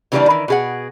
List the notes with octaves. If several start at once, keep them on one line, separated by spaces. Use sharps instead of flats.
C#3 E3 G3 A3 A#3 D4
D#3 E3
B2 G#4 F#5